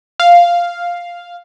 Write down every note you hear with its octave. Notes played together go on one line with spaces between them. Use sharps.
F5